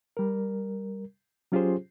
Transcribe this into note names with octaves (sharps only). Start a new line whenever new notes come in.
G3 A#4
F#3 C#4 F4 G4 G#4 C5